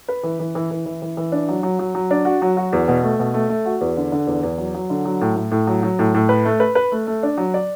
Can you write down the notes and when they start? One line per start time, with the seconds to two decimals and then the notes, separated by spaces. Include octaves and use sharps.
0.08 B4
0.23 E3
0.39 E3
0.55 E3
0.71 E3
0.86 E3
1.02 E3
1.17 E3
1.32 D4
1.49 F#3
1.63 F#3
1.79 F#3
1.95 F#3
2.11 D4
2.25 F#4
2.42 F#3
2.57 F#4
2.73 E2
2.88 B2
3.03 A3
3.19 B2
3.34 A3
3.49 A3
3.66 F#4
3.81 E2
3.97 D3
4.12 D3
4.27 E2
4.43 E2
4.58 F#3
4.74 F#3
4.90 D3
5.05 F#3
5.21 A2
5.36 A2
5.51 A2
5.67 F#3
5.83 F#3
5.99 A2
6.14 A2
6.29 B4
6.45 A3
6.60 B4
6.75 B4
6.92 A3
7.07 A3
7.23 D4
7.38 F#3
7.54 D5